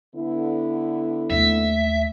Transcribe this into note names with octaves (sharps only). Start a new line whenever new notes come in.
D3 B3 E4
D#2 A3 E5